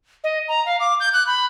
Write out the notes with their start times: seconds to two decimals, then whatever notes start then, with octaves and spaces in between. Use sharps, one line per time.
0.24 D#5
0.48 A#5
0.66 F5
0.80 D6
1.00 G6
1.13 F#6
1.27 B5